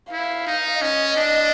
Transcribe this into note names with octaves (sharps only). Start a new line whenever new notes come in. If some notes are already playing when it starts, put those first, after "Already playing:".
E4 F5
D#4
C#4 D#5
D4